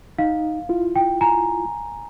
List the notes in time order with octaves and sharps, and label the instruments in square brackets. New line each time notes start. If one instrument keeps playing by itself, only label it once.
[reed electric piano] D#4 [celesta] F5
[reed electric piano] E4 F4
[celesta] G5
G#5 A#5